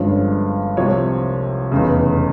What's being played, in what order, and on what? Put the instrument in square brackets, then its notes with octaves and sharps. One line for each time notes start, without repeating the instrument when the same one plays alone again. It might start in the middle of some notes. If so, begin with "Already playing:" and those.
Already playing: [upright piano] G1 G2 F3 G#3 C#4 F5
C2 C3 F3 C#5
F1 E2 C#3